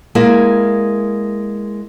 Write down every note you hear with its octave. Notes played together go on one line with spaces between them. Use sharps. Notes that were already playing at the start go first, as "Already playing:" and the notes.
G#3 A#3 E4